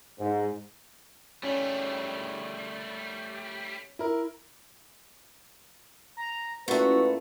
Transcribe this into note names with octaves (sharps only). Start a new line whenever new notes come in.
G#2
G3 A3 C#4
E4 A#4
A#5
A#2 A3 C#4 E4 F#4 B4